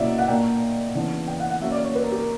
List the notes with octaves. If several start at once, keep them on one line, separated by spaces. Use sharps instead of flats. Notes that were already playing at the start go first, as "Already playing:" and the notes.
Already playing: B2 F#3 A#3 C#4 E4 D5 E5
F#5
A#2 A#3 D4 G5
C#3 E3 B3 D4
G5
F#5
F#5
F#3 A#3 C#4 E5
D5
C#5
B4
A#4
G4
A#4